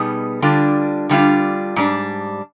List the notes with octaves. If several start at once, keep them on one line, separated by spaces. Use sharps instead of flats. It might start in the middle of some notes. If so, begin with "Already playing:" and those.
Already playing: B2 G3 B3 D#4 G#4
D3 G3 D4 F4
D3 G3 D4 F4
G#2 G3 D4